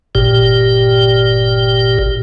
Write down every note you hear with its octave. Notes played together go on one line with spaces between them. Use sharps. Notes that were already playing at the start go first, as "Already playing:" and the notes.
G1 A#2 G4